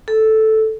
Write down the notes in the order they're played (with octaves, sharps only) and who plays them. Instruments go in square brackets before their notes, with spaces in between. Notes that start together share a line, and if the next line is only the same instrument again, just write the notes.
[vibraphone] A4